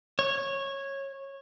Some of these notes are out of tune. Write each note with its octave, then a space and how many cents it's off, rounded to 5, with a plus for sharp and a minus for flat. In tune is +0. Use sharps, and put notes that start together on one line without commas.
C#5 -15